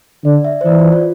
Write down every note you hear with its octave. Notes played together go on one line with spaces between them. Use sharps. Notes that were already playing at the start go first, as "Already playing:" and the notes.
D3 D5
E5
C5
E3 D5
F4
F4